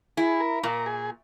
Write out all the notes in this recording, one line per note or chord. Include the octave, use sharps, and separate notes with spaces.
E4 G#4
A#4
A#2 A#4
G#4